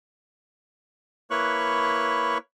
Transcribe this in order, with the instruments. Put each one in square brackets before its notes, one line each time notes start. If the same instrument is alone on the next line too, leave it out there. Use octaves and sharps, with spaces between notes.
[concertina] A#3 E4 B4 C#5 C#6 F#6